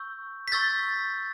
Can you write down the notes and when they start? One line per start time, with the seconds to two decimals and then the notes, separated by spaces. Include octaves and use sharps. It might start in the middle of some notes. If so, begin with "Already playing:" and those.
Already playing: C#6 E6 G6
0.48 B6
0.52 C#6 E6 G6 A6